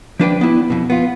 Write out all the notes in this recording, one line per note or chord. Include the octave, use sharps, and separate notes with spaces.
F3 D4 B4 G5
B3 E4
F2 B2
B3 F4